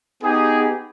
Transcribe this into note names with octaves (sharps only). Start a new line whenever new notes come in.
B3 D#4 G4 G#4